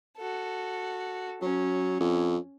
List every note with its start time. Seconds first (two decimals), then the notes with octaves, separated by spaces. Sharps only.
0.17 F#4 A4
1.42 F#3 C#4
2.01 F2